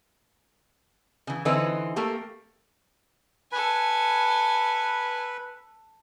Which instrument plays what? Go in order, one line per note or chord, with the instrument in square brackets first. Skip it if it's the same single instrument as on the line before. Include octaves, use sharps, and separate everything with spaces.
[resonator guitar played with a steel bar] C#3 E3
D3 E3 C4 D#4 E4 B4
A3 A#3 G4
[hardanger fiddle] A4 G#5 [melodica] B4 B5